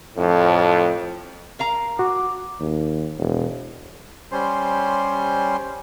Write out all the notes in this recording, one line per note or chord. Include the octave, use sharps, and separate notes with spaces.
F2 A2
A#4 F5 A#5
F#4 D6
D#2
E1
G3 C#4 C5 C6